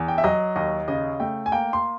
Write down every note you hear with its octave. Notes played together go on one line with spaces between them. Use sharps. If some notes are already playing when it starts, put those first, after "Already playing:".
Already playing: E2
G5
E5
F#3 D#5
D#2 D#5
C#3 D#5
A3 G5
G#5
A#3 G5
C6